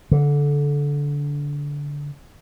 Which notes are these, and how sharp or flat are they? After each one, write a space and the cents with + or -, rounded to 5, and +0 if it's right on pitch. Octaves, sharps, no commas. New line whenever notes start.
D3 -20